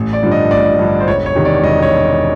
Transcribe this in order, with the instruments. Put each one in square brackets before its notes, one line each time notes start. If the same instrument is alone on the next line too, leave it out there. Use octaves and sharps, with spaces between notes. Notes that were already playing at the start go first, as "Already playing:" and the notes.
Already playing: [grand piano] A1
D5
G2 D3 F3
D#5
A1 D5
G2 D3 F3
C5
E1 C#5
C#5
E2 C3 D#3
D5
E1 D#5
C#5